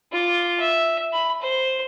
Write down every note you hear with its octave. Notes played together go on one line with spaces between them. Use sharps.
F4 D6
E5
B5
C5